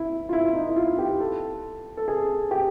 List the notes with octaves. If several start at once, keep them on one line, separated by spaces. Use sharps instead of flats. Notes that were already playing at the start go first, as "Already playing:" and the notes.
Already playing: E4
F4
E4
D#4
E4
F4
G4
A4
A4
G#4
G4